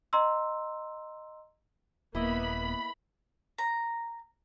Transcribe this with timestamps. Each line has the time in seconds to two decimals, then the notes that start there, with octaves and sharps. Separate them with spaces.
0.13 D#5 A#5 C6 E6
2.15 D#1 A#3 B3 E4 D#5 B5
3.58 A#5